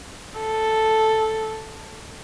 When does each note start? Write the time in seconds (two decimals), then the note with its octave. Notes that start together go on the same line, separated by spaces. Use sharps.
0.39 A4